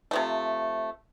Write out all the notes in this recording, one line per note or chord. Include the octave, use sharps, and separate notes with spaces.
C3 F3 A3